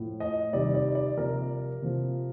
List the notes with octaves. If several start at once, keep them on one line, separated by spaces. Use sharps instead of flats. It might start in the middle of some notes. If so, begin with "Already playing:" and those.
Already playing: A2 F3
D#5
C3 D#3 G3 D5
D5
D5
C3 F3 A#4
C3 F3